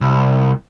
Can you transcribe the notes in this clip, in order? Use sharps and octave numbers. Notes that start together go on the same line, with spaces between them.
C2